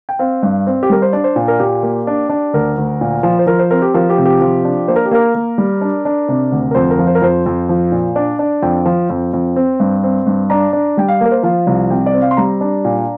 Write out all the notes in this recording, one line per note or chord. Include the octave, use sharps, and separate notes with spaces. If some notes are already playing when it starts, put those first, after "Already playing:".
G5
C4 F5
G2
C4
G4
G3 A#4
C5
D4 D5
C5
A#2
A#4
A#2 G4
A#3
D4
D4
D2 A#4
D2
A#2
F3
C5
F3 A#4
C5
C4 A#4
G4
F3 A#4
G4
C3
G4
F3
D4
A#3 C5
A#4
G4
A#3 A#4
A#3
G3
D4
D4
C3
D2
A#4
F2 C5
A#4
F3
C5
A#4
F2 C5
F2
F3
A#2
D4 D5
D4
F2 G5
F3
F2
F2
C4
G2
C4
G2
D4 A#5
D4
G3 G5
F5
A#3 A#4
C5
F3 F5
C2
C3 G5
D5
C4
F5
C6
G3 A#5
D4
A#2